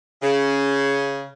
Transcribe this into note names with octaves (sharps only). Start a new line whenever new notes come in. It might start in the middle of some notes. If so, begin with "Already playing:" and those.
C#3